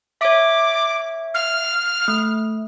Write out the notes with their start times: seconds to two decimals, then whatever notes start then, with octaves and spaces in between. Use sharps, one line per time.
0.21 C#5 E5 D6
1.34 F6
2.08 A3